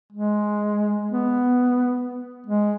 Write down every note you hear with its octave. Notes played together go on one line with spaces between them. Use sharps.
G#3
B3
G#3